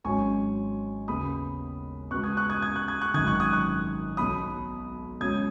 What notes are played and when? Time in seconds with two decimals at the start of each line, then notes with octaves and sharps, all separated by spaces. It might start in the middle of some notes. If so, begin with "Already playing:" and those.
0.04 G#1 G#2 F#3 C#4 G#5 C#6
1.08 D#2 C#3 B3 B5 D#6
2.11 C#2 B2 B3 C#6 F#6
2.23 D#6 G#6
2.37 C#6 F#6
2.50 D#6 G#6
2.62 D#6 G#6
2.76 C#6 F#6
2.88 D#6 G#6
3.01 C#6 F#6
3.14 G#1 F#2 D#3 D#6 G#6
3.27 C#6 F#6
3.40 D#6 G#6
3.53 C#6 F#6
4.17 B1 B2 F#3 B5 D#6
5.20 C#2 B2 F#3 C#4 D#6 G#6